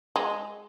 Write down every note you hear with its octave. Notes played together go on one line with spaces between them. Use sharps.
G#3